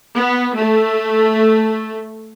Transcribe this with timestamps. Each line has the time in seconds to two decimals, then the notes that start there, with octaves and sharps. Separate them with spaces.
0.16 B3
0.57 A3